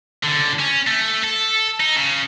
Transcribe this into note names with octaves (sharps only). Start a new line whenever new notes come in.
C#2 D3
C#4
A3
A4
D#4
C#3